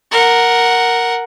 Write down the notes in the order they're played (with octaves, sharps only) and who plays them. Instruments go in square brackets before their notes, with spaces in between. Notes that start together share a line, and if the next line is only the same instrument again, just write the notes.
[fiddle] A#4 F#5